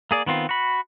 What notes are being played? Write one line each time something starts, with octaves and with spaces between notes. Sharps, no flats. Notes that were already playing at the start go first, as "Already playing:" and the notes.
A#3 G#4 D5
D#3 B3 C4 F4
F#4 B5